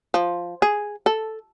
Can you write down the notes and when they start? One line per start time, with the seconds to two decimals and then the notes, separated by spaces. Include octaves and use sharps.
0.14 F3
0.62 G#4
1.06 A4